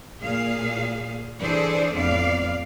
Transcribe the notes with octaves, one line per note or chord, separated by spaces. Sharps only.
A#2 G#4 F5
E3 D4 G#4 A4 C5 D5
F2 A2 B3 D5 F5